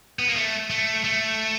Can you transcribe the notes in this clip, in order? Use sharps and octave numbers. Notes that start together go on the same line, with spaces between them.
B3
A#3
A3
A3
A3